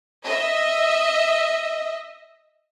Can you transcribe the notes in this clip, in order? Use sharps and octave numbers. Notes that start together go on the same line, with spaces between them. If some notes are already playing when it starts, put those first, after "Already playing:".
D#5 E5